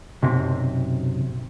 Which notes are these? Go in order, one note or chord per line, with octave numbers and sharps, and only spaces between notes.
B1 F#2 C3